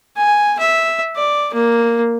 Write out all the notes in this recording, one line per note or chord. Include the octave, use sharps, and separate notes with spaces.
G#5
E5
D5
A#3